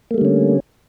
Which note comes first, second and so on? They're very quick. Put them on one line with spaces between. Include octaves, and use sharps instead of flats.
A#3 A3 G3 D3 C#4